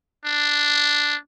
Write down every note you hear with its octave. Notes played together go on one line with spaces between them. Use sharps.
D4